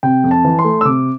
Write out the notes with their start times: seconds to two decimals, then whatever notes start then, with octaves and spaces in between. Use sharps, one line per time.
0.03 C3 G5
0.24 F2
0.31 A5
0.44 E3
0.59 C6
0.64 A3
0.81 E6
0.85 C3 D6